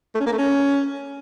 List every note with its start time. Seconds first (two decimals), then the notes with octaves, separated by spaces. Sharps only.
0.15 A3
0.20 C#4
0.26 A#3
0.32 A3
0.38 C#4